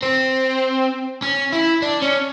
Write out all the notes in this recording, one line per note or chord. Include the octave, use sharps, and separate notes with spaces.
C4
C#4
E4
D4
C#4